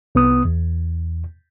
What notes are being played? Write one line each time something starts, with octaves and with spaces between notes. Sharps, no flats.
C2 B3 D#6
E2